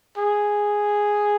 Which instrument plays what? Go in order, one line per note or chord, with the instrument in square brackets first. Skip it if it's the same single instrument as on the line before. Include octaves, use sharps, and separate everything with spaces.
[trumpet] G#4